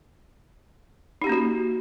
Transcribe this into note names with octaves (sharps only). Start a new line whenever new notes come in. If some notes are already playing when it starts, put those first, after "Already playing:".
A#3 C#4 D#4 F#4 G4